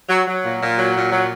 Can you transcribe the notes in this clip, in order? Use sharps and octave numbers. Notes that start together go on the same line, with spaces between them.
F#3
F#3
A#2
A#2
F#3
A#2
F#3